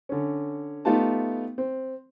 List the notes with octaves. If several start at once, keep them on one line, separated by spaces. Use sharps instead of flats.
D3 C#4
A3 B3 D#4 F4 G4 A5
C4